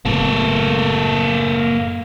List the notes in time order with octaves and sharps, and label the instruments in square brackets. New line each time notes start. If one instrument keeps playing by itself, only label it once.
[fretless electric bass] F#1 A2 B3 [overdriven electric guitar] A#3 A4